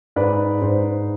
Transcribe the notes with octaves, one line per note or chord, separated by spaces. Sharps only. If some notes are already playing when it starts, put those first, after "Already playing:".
G#2 B4 D5
G#2 C5